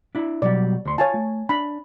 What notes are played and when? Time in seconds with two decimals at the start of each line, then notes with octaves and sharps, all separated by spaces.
0.15 D4 E4
0.42 B2 F#3 G3 D5
0.85 D2 C6
0.98 F4 C#5 F5 G#5 A5
1.14 A3
1.49 D4 B5